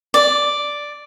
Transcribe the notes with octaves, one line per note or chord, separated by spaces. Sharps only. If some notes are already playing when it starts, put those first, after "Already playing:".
D5